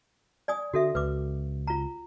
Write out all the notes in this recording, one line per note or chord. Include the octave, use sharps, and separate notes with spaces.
D5 G#5 D#6
D3 F#4 A4 E5
C#2 B4 D6
F4 A#5